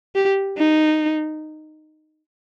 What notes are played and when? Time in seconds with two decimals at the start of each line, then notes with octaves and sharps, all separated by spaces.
0.15 G4
0.58 D#4